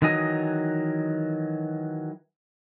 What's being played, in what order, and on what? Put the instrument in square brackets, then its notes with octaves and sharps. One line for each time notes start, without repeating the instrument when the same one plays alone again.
[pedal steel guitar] D#3 E3 F#3 D#5 G#5